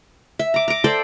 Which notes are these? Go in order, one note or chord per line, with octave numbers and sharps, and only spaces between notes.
E5
A#5 D6
A#5 D6
A4 C5 D5 G5